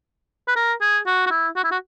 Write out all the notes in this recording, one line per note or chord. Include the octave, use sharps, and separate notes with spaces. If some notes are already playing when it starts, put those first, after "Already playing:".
B4
A#4
G#4
F#4
F#4
E4
F#4
E4
F#4